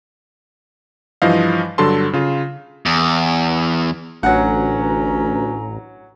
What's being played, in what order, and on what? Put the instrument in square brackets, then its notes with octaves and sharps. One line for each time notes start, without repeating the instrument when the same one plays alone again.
[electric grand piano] G2 E3 F3 C5 D#5 F5
G2 D3 F#3 A4 A5 C6
C#3 F4
[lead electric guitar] E2
[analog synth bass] A1 [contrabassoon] D2 [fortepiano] F#3 F#5 [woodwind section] C#4 B4 A#5